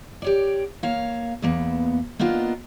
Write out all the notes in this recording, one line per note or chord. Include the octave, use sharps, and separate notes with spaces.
G4 C#5 D5
A#3 C#5 F5
E2 A#3 B3
A#3 B3 D4 D#4 F4